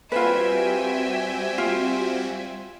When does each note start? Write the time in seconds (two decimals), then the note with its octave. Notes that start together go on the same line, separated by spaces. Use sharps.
0.12 G3 C4 F4 F#4 B4 E5 G5 G#5
1.58 F4